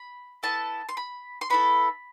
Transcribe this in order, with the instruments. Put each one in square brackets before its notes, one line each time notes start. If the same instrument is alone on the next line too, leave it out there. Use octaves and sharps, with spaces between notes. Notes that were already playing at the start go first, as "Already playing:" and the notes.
Already playing: [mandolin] B5
B3 E4 A4 A5
C6
B5
C6
B3 E4 A4 B5